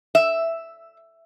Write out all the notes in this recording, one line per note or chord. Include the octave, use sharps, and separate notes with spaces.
E5